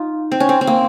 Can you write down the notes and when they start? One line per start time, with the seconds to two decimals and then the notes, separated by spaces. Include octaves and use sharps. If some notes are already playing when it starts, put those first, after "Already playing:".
Already playing: D#4 F4
0.32 C4
0.40 C#4
0.49 C4
0.61 C4
0.67 A#3